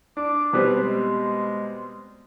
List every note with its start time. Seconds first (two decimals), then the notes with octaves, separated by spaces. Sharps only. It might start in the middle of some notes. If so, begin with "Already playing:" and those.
0.17 D4 D6
0.53 B2 G3 C4 B4
0.78 G#3